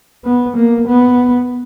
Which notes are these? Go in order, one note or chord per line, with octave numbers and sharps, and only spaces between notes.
B3
A#3
B3